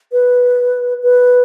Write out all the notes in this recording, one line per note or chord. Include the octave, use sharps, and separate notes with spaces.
B4
B4